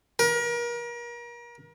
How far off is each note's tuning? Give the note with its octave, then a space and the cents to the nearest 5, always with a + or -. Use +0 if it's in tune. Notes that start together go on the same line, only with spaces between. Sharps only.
A#4 +35